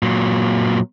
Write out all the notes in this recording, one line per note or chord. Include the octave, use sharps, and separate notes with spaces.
A#2 F#3